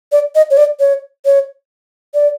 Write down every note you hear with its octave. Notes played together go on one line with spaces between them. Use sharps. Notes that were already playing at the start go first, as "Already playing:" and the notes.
D5
D#5
C#5
D5
C#5
C#5
D5